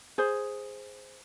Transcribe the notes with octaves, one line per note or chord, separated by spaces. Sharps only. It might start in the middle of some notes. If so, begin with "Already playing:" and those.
G#4 C5